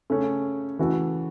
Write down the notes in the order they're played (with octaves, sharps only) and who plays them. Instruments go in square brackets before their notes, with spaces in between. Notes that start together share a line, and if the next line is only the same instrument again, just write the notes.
[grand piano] C#3 A3 C#4
C#3 E3 A3 F#4 A4